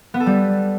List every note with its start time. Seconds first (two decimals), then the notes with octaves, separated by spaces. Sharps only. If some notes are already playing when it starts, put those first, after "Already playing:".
0.14 B3
0.20 A4
0.26 G3